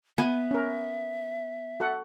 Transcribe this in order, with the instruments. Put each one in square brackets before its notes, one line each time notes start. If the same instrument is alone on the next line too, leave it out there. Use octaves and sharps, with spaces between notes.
[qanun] B3 [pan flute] E5 [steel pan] G#5
[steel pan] C#4 A#4
F#4 A4 F#5